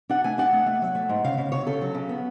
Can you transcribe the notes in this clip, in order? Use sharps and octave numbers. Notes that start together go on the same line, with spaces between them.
D4 F#5
A3 G#5
D4 F#5
A3
A3
F#3
A3
G#2
C#3 F5
C#3
C#3 C#5
C#3 A4
F#3
C#3
B3